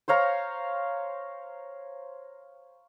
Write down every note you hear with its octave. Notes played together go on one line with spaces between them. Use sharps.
C5 C#5 F5 A#5